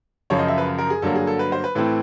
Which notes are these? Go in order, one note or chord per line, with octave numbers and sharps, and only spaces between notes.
F#2 C#3 F3 C#5
D#5
E5
B4
A#4
G#4
G2 D3 F#3 A#3 A4
G#4
A4
B4
C5
B4
A2 E3 A3 C4 B4